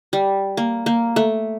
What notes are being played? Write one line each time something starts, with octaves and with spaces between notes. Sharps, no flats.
G3
A#3
A#3
A3